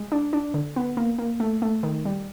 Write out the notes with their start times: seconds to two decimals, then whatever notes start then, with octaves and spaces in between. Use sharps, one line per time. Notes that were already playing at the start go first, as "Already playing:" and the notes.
Already playing: G#3
0.12 D4
0.33 D4
0.54 D3
0.76 B3
0.97 A#3
1.18 A#3
1.40 A3
1.62 A3
1.83 D#3
2.05 G3